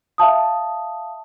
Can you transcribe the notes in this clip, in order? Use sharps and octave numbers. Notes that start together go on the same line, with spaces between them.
E5 F5 A5 D#6